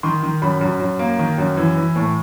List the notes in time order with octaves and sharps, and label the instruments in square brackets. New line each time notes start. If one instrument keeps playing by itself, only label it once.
[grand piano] D#3 C6
D#3
F#2 B5
F#2
F#2
A#3
D#3
F#2
E3
E3
A2